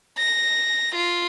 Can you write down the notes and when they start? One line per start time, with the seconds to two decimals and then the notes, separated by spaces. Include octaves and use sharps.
0.18 A#6
0.95 F4